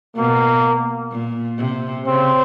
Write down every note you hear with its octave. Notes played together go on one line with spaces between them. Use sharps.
B2 A#3
A#2
C3
C#3 C4